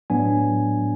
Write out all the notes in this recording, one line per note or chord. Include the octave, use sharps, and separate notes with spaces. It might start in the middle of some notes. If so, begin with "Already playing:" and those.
A2 F#3 B3 D4 G#5